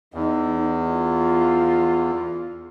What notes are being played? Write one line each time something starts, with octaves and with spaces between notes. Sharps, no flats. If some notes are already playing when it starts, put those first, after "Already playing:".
E2 D#4
F4